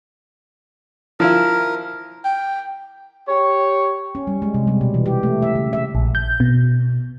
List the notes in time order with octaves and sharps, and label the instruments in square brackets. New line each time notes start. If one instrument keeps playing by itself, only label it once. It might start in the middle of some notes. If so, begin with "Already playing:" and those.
[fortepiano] F3 E4 F4 [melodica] A#4
[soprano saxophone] G5
[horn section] G4 C#5
[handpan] C#4
G3
G#3
C3
G3
B2
E3
G4
A3
E5
C#3
E5
[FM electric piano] A#1
G6
B2